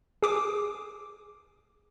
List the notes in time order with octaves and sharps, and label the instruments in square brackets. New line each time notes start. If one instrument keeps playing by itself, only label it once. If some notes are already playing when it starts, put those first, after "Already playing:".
[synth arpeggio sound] G#4 D6 D#6